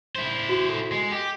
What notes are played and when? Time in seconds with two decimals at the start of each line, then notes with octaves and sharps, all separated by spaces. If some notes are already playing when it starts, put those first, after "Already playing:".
0.15 E4 C5
0.49 F#4
0.70 A4
0.92 G#3
1.12 G4